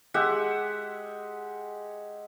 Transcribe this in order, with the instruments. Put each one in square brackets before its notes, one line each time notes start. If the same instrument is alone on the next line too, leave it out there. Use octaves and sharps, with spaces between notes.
[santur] G#3 G4 E5 F#5